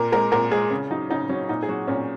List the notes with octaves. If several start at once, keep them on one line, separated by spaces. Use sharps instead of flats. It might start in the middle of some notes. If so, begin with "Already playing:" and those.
Already playing: A#2 A#4
G#3 A#4
A#2 A#4
G#3 G#4
C#3
F#3 D#4
C#3 D#4
F#3 C#4
A#2 D#4
G#4
F#3 F#4
A#2 C#4